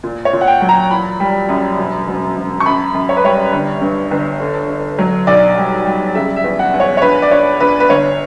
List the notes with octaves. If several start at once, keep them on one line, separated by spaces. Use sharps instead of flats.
A#2
C#5
A#2
F#5
G5
F#3
A#5
E3 B5
G3
F#2
E1
E1
E1
C#6
F#2 B5
F#2
C#5
B4
G3 C#5
G1
G2
G1
D3
D3
F#3
B1 D5
G3
G3
C#3 E5
E5
E2
F#5
E2
C#5
C#5
A#1 B4
D5
A#1 C#5
A#1 B4
B4
G1 C#5